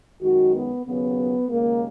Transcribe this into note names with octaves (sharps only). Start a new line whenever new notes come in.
F#2 D#3 G#3 F#4
B3
D#2 C#3 F#3 B3
D#2 C#3 G#3 A#3